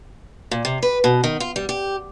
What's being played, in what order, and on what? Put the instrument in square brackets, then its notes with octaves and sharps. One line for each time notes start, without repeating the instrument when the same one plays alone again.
[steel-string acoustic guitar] A#2
C3
B4
B2
D#3
F4
G3
G4